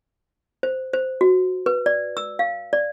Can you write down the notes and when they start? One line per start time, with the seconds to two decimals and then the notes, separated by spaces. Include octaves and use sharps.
0.63 C5
0.93 C5
1.21 F#4
1.66 B4
1.86 D5
2.17 E6
2.39 F5
2.73 D5